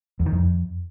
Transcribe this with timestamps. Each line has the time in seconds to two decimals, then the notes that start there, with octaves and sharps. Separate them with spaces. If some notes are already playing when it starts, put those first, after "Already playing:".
0.20 E2
0.26 D#3
0.32 F2